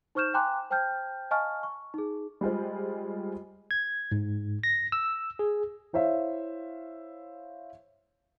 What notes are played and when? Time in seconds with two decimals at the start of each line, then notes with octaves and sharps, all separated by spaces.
0.15 D#4 C5 C#6 F6 G6 E7
0.34 G5 G#5 A#5 C6 D6 F#6
0.70 C5 G5 A5 F6 G6
1.31 D#5 F5 G#5 A5 C#6 F6
1.63 C#6
1.94 D#4 G#4
2.41 G3 G#3 F4 C5
3.71 G#6
4.12 G#2
4.63 A#6
4.92 E6
5.39 G#4
5.93 E4 C5 C#5 E5 F5